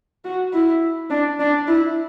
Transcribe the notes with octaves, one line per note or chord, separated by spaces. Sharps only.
F#4
E4
D4
D4
E4